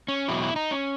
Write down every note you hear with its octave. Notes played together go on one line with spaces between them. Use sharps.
C#4
E2 B2 F#3 E4
E4
D#4
C#4